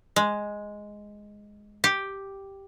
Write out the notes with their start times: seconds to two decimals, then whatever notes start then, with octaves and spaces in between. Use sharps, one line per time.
0.16 G#3
1.84 G4